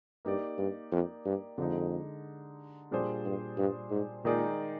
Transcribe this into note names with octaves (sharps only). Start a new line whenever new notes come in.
G2 A#3 D#4 G4 D5
G2
F2
G2
F2 D3 G#3 D#4
F2 A#2 G3 D4 G#4 C5
G2
G2
G#2
A#2 D#3 G#3 D#4 G#4 D5